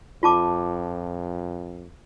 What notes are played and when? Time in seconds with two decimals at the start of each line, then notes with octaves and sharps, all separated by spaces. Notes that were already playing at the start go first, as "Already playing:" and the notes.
0.23 F2 F4 A5 D6